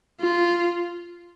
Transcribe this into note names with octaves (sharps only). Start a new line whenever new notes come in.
F4